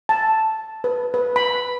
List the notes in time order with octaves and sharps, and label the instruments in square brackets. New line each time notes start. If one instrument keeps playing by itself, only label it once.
[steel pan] A5
B4
B4
B5